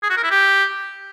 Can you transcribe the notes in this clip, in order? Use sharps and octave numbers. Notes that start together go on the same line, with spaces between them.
G#4
F#4
A#4
E4
G4